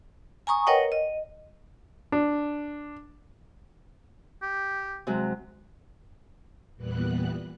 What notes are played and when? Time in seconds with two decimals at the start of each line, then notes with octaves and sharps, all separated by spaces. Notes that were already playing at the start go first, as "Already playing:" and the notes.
0.47 G#5 A#5 C#6 D#6
0.67 A#4 B4 C#5 D#5 F#5 G5
0.92 D#5
2.12 D4
4.42 G4
5.07 C3 F#3 G#3
6.76 E2 A#2 E3 G3 B3 F#6